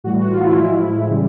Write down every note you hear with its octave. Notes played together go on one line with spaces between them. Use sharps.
A2 E3 G3 F#4
F#4
F4
E4
F4
A2 F3 G#3 E4
C#3 E3 G3